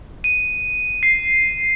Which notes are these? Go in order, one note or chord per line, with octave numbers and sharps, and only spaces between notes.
D#7
C7